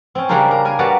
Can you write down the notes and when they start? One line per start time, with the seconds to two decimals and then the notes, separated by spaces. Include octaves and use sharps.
0.15 C4 C#4
0.29 C#3 G3 A#3 D4 A#4 C5
0.51 A#4
0.65 A#4 G#5
0.79 G3 F#4 A#4 B4 A5 A#5